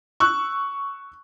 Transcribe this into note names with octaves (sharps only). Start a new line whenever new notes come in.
C#6 E6 F#6